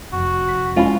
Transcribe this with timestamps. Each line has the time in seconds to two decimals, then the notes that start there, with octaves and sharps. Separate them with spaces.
0.13 F1 F2 F#4
0.49 B6
0.76 G#3 C#4 E4 F4